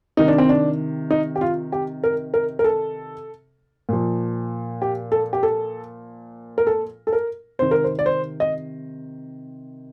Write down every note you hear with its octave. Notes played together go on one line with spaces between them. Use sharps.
C3 D#3 D#4
D4
C4
D4
D#4
G4
F4
G4
A#4
A#4
A#4
A4
A#2 F3
G4
A4
G4
A4
A#4
A4
A4
A#4
C3 D#3 C5
A#4
C5
D5
C5
D#5